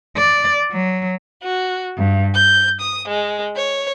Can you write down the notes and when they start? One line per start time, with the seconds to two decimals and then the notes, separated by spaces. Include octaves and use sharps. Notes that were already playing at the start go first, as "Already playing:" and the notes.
0.17 D5
0.72 F#3
1.43 F#4
1.96 G2
2.34 G6
2.80 D#6
3.09 G#3
3.55 C#5